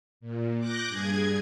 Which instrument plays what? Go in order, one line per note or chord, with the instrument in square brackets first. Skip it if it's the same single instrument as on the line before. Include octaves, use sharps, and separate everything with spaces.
[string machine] A#2
D6 F#6 G6 A#6
G2 G#4 G#6